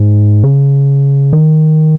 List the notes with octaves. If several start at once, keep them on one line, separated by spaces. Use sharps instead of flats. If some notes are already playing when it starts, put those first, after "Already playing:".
Already playing: G#2
C#3
D#3